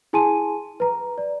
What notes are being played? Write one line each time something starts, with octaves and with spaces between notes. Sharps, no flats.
E4 G#4 G#5 A5 C6 D#7
B4 A#5
D5